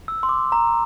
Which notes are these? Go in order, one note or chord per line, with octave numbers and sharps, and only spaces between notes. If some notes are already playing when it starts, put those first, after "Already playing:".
E6
C6
D6
A#5